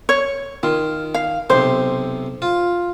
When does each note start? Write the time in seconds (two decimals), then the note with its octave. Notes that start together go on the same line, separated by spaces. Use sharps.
0.09 C#5
0.63 D#3 F4
1.14 F5
1.50 B1 C3 C5
2.42 F4